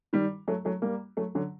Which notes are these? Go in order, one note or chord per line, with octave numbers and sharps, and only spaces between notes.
D#3 G3
F#3 A3
F#3 A3
G3 A#3
F#3 A3
D3 F#3